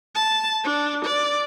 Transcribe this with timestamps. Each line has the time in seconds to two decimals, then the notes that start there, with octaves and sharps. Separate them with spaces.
0.15 A5
0.64 D4
1.05 D5